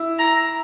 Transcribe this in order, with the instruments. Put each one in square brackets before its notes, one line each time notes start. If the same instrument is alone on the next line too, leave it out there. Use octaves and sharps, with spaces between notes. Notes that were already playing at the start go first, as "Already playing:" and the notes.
Already playing: [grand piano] E4
[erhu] A#5